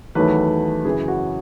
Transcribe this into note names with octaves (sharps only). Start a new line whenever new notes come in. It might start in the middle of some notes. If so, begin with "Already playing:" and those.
E2 D#3 F#3 A3 B4
F#2 C#3 E3 G#4
F#4